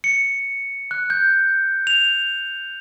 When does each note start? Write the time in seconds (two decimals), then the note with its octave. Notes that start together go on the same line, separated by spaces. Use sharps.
0.04 C#7
0.91 F#6
1.10 G6
1.87 F7